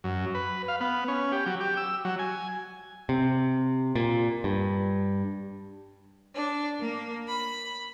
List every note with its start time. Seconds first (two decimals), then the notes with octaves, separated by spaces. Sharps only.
0.04 F#2
0.34 B4
0.68 F5
0.81 B3
1.08 C#4
1.32 G4
1.46 F#3
1.60 G4
1.77 E6
2.05 F#3
2.19 G#5
3.09 C3
3.96 A#2
4.44 G2
6.34 D4
6.79 A#3
7.28 B5